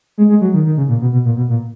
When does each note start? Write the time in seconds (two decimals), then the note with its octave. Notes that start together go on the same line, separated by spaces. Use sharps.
0.18 G#3
0.29 G#3
0.41 F#3
0.54 D#3
0.66 D#3
0.77 C#3
0.89 A#2
1.01 B2
1.13 B2
1.25 A#2
1.37 B2
1.49 A#2